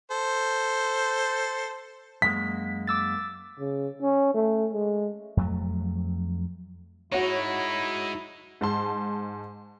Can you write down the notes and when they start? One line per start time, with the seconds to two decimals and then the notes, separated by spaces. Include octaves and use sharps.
0.11 A4 C5
2.22 F#2 G#3 A#3 B6
2.87 D6 E6 A6
3.59 C#3
4.02 C#4
4.35 A3
4.73 G#3
5.37 F2 F#3 A3
7.12 G#3 D#4 E4 F#4 C#5
8.61 G#2 A5 C6